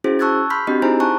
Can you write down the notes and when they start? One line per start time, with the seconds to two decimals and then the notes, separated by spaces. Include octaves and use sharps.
0.04 C#4 E4 F#4 G#4 C5
0.19 A5 C#6 E6 F#6 G#6 A6
0.50 B5 C6 F6 G6 B6
0.67 C4 D4 F#4 G4 D#5
0.82 D#4 E4 G#4 C5 G#5 A#5
1.00 G#5 A5 C#6 F#6